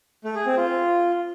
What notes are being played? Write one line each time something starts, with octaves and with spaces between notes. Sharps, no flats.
A3
G#4
C4
F4